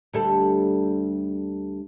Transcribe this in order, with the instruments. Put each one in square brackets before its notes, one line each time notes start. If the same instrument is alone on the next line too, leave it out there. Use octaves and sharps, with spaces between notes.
[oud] D2 G3 A4